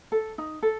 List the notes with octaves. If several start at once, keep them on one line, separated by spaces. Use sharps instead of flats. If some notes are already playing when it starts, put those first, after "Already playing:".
A4
D#4
A4